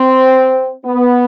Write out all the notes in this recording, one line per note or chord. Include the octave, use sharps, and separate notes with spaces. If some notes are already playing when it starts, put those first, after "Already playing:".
Already playing: C4
B3